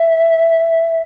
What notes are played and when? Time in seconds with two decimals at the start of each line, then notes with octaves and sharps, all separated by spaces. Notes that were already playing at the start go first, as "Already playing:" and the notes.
Already playing: E5